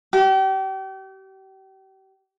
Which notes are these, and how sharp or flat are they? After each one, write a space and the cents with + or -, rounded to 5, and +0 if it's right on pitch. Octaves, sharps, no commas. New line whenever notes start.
G4 -35